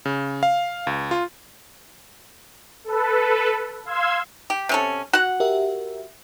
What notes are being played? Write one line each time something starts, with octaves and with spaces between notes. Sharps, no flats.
C#3
F5
C#2
F4
A4 B4
F5 C6 E6 G#6
G4
C3 C#4 A4
F#4 F#5
G4 A#4 E5